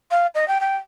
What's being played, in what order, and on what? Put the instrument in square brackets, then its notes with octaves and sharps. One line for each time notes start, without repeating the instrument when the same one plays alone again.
[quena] F5
D#5
G5
G5